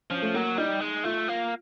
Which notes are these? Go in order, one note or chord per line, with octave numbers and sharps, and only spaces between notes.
F3 C#4
A3
F#3 A#3
G3 D#4
G#3
A3 F4
A#3